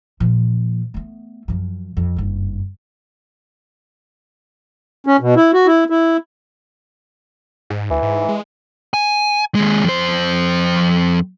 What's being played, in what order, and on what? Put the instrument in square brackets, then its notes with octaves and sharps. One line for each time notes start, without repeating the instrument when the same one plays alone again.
[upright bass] A#2 F3
A3 B3
F#2 F3
F2
F#1 G2
[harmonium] C#4
B2
E4
F#4
E4
E4
[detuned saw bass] G#2
[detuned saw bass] D2 [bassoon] E3
[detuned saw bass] G#2
G#3
[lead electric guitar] G#5
D#2 G#3
F2 C5